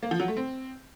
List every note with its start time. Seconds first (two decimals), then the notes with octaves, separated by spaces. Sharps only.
0.03 A#3
0.11 F3
0.20 F#3
0.28 A3
0.37 C4